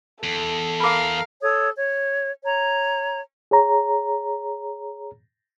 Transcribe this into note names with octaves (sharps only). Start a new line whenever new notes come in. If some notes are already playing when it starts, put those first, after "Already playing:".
E2 A4
A#4 F5 B5 D6
A4 C#5 D#6
C#5
C#5 A#5
G#4 C#5 A#5